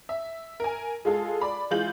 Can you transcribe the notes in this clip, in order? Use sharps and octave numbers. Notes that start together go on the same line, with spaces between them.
E5
A#4 G#5
G#3 F4 G#4 A4
D5 B5
E3 G#3 F4 G6 F#7